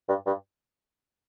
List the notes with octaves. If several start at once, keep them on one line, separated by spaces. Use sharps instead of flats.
G2
G2